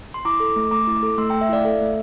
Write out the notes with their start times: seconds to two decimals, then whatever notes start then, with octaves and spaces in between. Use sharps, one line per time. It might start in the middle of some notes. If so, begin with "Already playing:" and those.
0.14 C6
0.25 E4 A#5 D6
0.40 A4
0.56 A3
0.71 A3 A#5 D6
0.87 E4
1.03 A4
1.18 A3 C6 E6
1.30 A3 G5 A#5
1.41 E5
1.49 E4 D5 F5
1.65 A4 E5
1.81 A3